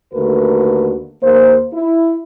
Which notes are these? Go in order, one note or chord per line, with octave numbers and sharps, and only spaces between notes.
D#2 D3 A3 F#4 A#4 B4
D#2 A#3 A#4 C5
E4